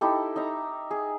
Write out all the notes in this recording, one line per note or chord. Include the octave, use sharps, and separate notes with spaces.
D#4 E4 G4 A4
D#4 E5 A#5
G#4